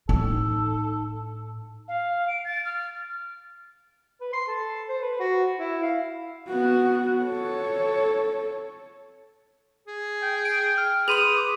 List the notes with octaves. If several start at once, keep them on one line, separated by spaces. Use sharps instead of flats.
A2 D#4 F4 A4
F5
D7
A6
F6
B4
C6
A4
C5
B4
F#4
E4
F5
B3 F#4
A4 C#5
G#4
G5
D7
F6
G#4 B4 C6 D#6 D#7 F7 F#7
D6